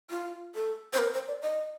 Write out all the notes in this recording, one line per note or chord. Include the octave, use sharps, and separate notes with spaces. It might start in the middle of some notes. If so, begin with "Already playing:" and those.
F4
A4
C5
A#4
C5
D5
D#5